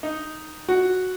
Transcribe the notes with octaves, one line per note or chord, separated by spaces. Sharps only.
D#4
F#4